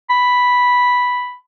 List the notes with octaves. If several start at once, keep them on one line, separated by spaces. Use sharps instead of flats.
B5